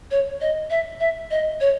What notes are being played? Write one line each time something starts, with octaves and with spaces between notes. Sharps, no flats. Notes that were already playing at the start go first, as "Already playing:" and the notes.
C#5
D#5
E5
E5
D#5
C#5